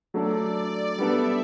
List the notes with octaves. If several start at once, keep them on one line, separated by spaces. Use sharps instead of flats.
F#3 A3 D4 A4 D5
G3 B3 D4 A4 E5